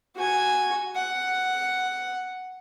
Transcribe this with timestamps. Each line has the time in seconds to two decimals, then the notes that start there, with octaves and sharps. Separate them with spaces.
0.16 F#4 G#5
0.95 F#5